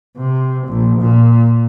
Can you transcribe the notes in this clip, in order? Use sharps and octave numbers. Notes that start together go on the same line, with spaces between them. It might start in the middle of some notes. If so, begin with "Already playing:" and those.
C3
A#1
A#2